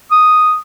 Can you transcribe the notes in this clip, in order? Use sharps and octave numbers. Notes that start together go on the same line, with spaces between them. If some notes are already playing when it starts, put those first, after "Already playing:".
D#6